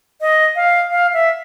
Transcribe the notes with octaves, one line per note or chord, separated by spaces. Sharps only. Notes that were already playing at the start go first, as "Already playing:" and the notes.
D#5
F5
F5
E5